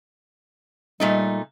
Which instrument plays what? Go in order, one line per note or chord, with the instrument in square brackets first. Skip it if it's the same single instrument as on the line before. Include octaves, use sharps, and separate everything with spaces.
[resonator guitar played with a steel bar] A#2 A3 D#4 [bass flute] G3